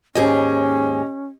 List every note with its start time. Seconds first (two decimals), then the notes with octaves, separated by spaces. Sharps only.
0.15 D#2 G#2 C#4 G4 G#4 D#5